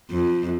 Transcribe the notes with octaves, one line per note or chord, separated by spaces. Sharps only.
F2